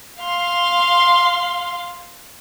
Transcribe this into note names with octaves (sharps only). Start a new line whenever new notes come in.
F5 C6